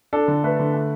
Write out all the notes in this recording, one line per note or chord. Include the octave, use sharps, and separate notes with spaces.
D4 A4
D3
A3 B4
D3
A3